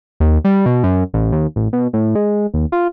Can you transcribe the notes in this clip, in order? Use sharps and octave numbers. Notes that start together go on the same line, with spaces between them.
D#2
G3
B2
F#2
A1
D#2
A1
B2
A2
G#3
D#2
F4